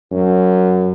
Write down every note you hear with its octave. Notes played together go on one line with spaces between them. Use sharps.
F#2